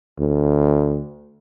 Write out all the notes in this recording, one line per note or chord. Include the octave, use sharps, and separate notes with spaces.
D2